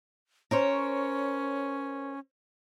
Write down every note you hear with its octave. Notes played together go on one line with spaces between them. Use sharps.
C#4 A#4 C5 C#5